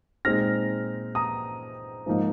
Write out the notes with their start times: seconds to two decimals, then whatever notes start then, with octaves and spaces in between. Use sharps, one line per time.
0.25 A#2 G#3 C4 D#4 F6 A#6
1.15 A#5 D#6
2.06 G#2 F3 A#3 D#4